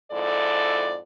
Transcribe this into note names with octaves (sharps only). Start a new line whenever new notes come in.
F2 G#2 E4 A4 D5